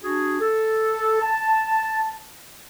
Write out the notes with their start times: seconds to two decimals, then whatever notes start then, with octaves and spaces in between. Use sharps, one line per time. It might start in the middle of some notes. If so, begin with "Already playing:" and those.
0.03 D4 F#4 G#4
0.40 A4
1.22 A5